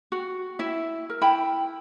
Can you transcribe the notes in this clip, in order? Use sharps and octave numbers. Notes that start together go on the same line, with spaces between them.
F#4
E4 E5
A#4
E4 G5 B5